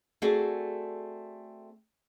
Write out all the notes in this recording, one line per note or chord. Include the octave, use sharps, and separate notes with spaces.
A3 C4 F#4 G#4 A4 D5